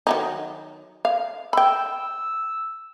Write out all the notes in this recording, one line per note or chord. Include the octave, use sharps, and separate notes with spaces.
D#3 F#3 D#4
F5
G5 B5 E6